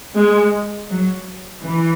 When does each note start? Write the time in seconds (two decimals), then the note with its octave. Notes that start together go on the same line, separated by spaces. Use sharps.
0.16 G#3
0.90 F#3
1.63 E3